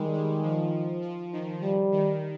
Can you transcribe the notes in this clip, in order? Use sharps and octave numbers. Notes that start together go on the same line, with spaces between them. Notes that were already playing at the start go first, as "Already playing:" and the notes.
Already playing: D#3 G3 G#3
G3
F3
F3
D#3
F3 G3
D#3